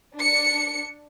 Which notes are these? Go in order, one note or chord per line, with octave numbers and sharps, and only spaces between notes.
D4 C#7